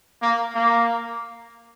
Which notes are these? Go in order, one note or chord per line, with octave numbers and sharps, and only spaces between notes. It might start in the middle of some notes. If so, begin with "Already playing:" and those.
A#3
A#3